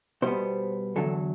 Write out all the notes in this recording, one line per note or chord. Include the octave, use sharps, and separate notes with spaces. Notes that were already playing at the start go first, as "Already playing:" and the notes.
B2 G3 B3 C5
E2 D3 F#3 A4